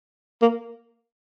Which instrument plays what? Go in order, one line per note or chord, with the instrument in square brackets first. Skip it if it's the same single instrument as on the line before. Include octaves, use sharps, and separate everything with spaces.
[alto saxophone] A#3